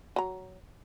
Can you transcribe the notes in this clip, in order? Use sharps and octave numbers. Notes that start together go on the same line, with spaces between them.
F#3 A#5